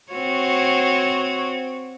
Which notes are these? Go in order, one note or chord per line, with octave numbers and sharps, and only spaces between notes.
C4 F#4 C#5